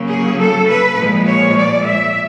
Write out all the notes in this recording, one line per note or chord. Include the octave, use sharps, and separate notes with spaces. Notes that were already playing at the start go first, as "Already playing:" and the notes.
Already playing: C#3 F#3 A#3
G#4
A4
B4
A#2 F3 G#3
C#5
D5
E5